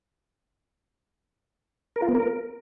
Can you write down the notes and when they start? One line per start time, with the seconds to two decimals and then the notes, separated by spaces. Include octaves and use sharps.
1.96 A#4
2.02 F4
2.08 B3
2.15 A#4